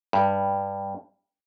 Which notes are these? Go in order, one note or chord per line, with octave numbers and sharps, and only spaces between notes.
G2